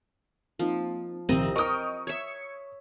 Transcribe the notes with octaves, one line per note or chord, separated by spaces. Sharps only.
F3 A#3 C4 D#4
C2 A#2 D#3 F3 C4 D#5
A#4 D#5 G5 C#6 D#6
C#5 E5 G#6 C#7